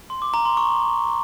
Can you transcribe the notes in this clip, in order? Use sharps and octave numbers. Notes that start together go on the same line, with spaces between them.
C6
D6
A#5
C6
C#6